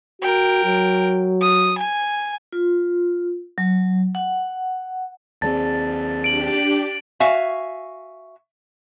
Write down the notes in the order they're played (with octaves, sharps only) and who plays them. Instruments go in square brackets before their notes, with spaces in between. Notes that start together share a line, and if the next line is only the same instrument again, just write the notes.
[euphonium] F#4 [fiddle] A#4 G5
[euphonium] F#3
[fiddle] D#6
G#5
[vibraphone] F4
F#3
F#5
[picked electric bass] D#2 G3 C4 [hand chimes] G#4 D5 A5 [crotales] A6
[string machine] D4 G4 [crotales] D7 F#7
[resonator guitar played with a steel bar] F#4 E5 F5 G#5